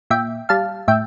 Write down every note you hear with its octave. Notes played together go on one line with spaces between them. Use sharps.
A#2 E5 G5
G3 F5 A5
A2 E5 G5